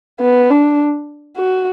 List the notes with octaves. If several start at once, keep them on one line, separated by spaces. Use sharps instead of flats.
B3
D4
F#4